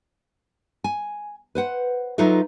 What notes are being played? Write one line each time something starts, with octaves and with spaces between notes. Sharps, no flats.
G#5
B4 C5 F#5
F#3 D#4 F4 A4 B4 E5